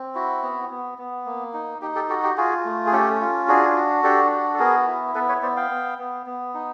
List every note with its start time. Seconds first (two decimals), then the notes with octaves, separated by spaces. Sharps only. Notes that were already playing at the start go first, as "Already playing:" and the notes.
Already playing: C4
0.15 E4 F#4
0.43 B3
0.70 B3
0.98 B3
1.26 A#3
1.54 D#4
1.82 D#4 G4
1.95 G4 A4
2.09 F#4 G4 A4
2.23 G4
2.37 F4 F#4 G#4
2.65 A3
2.86 G#4
2.92 C#4 G4 A4
3.21 F4
3.48 D4 F#4 G#4
3.76 F#4
4.03 D4 G4 A4
4.32 F#4
4.54 A4
4.59 B3 G#4 A#4
4.87 E4
5.15 B3 A4 B4
5.29 B4 C#5
5.42 B3 C5 D5
5.57 F5 G5
5.71 B3
5.98 B3
6.26 B3
6.54 D#4